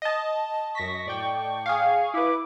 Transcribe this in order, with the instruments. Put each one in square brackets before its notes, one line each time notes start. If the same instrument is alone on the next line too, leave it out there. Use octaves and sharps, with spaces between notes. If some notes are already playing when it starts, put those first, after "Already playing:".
[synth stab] D#5 A5
[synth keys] F#2 A#6 B6 [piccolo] C#6
[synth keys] A2 D5 G5
[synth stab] G#4 F5
[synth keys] E4 B4 [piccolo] D6